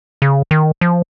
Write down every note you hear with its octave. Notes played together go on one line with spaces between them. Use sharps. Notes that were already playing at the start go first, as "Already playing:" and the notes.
C#3
D#3
F3